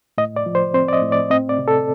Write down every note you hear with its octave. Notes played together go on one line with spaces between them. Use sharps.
A2 D#5
D5
F3
C5
C4 C5
D5
D#5
A2
D5
C4 D#5
D5
C3
A4